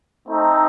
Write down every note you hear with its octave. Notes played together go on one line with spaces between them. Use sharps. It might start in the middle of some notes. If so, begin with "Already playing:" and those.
A3 C4 D#4